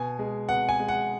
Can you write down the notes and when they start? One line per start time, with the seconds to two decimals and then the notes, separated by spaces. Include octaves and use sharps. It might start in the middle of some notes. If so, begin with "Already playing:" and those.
Already playing: B2 G#5
0.19 G#3
0.49 B2 F#5
0.69 G#5
0.79 G#3
0.88 F#5